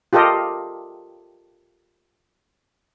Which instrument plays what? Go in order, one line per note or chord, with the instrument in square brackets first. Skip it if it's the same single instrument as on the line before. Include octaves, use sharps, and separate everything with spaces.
[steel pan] F4 G4 A4 A#4 D#5